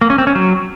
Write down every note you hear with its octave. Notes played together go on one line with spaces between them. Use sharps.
A#3
C#4
C4
C#4
F#3